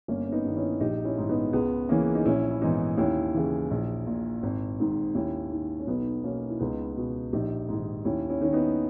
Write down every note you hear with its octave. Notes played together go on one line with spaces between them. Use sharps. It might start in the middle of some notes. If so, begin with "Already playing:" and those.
G1 A#3 C#4
C#4
B3 D#4
G2 D#3
C#4 E4
A#1 D#4 G4
C#4 E4
G#2 D#3
B3 D#4
C#2 G#3 B3
C#3 E3 A#3 C#4
D#4
A#1 C#4 E4
E4
G#2 E3 B3 D#4
D#2 C#4 E4
C#3 E3
A#1
A#2
G#1
G#2 D#3
D#2 C#4 E4
D#3
C#4
B1 B3 D#4
B2 A#3 C#4
E4
C#2 B3 D#4
B2
A#1 D#4 G4
G#2 D#3
D#2 C#4 E4
C#4 E4
D#3 C#4
B3 D#4